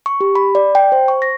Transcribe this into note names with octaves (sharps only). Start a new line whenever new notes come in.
C#6
G4
B5
D5
G5
C5
C#6
A#6